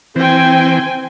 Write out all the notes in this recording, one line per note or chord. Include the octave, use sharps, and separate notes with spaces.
E3 C4 C5 G5 G#5